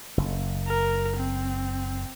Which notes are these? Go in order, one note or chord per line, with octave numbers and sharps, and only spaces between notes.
F#1
A#4
C4